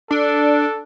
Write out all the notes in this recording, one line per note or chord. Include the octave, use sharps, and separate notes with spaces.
D4 A4